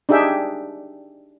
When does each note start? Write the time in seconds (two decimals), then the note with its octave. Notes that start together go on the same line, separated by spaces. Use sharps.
0.09 D4 D#4 G4 G#4 E5 G5